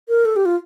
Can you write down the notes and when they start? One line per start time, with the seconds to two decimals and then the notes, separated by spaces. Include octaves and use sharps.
0.09 A#4
0.25 A4
0.36 G4
0.46 F4